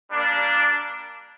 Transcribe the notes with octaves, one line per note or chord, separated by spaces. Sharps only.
G3 A#3 D4